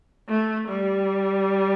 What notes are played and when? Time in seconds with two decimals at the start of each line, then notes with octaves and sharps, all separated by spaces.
0.29 A3
0.69 G3